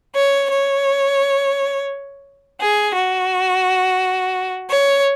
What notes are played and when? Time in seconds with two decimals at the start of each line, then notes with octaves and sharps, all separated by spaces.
0.16 C#5
0.52 C#5
2.62 G#4
2.96 F#4
4.71 C#5